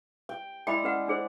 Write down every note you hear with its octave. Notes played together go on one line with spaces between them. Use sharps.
G5
G#3 E4 D5 G5 B5
C#4 B4 F#5
D4 G#4 C5